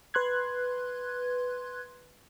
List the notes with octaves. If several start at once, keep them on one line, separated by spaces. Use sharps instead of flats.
B4 C6 F#6 G#6